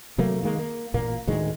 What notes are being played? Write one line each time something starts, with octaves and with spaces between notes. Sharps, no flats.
C3 F#3 A3 A#3
D#3 G#3 A#3
A#3
A1 A#2 A#3
D2 A2 D#3 G#3